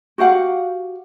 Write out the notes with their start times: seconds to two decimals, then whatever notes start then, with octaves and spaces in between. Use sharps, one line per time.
0.18 F#4 G4 F5 F#5